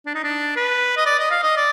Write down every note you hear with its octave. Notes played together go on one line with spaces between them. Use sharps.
D4
D#4
D4
B4
D#5
D5
D#5
F5
D#5
D5